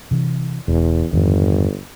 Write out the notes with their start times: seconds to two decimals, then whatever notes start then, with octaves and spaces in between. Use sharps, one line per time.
0.11 C3 E3
0.68 E1 E2
1.13 G1 F2 G#2 D#3